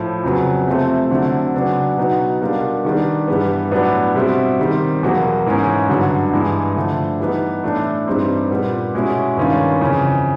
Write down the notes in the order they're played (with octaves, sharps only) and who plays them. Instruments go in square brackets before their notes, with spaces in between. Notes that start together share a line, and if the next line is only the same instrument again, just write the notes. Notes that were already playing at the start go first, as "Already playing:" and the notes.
Already playing: [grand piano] A2 F3 A3
F2 C#3 F#3 B3
C3 F3 A3 C4
D3 F#3 A3 C4 E4
C#3 F#3 B3 D4
B2 F#3 B3 D#4
B2 G3 A#3 D4 F4
D#3 G3 B3 D4
G2 E3 G3 B3
A2 F#3 B3 D4
B2 G3 C4 E4
D#3 G3 C4
E2 B2 F#3 A#3
G#2 E3 G#3 C#4
G2 D3 F#3
G2 E3 G#3
D3 F3 A3
E3 G3 B3 D#4
A2 E3 A3 D4
G2 E3 G3 C4 D#4
A#2 G3 B3
B2 G#3 C#4 E4
G2 D#3 G#3 C#4 F4
F2 C#3 E3